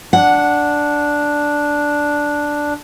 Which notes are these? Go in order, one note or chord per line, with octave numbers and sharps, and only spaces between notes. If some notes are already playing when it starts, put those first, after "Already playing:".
D4 F#5